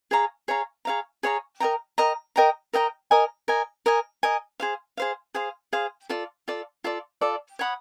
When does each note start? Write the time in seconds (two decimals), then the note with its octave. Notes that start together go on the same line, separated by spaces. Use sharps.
0.11 G#4 C#5 F5 A#5
0.48 G#4 C#5 F5 A#5
0.85 G#4 C#5 F5 A#5
1.23 G#4 C#5 F5 A#5
1.60 A#4 D#5 G5 A#5
1.98 A#4 D#5 G5 A#5
2.36 A#4 D#5 G5 A#5
2.73 A#4 D#5 G5 A#5
3.11 A#4 D#5 G#5
3.48 A#4 D#5 G#5
3.86 A#4 D#5 G#5
4.23 A#4 D#5 G#5
4.60 G#4 C5 F5
4.97 G#4 C5 F5
5.34 G#4 C5 F5
5.73 G#4 C5 F5
6.09 F4 A4 D5
6.48 F4 A4 D5
6.84 F4 A4 D5
7.21 F4 A4 D5
7.59 C#5 F#5 B5 D#6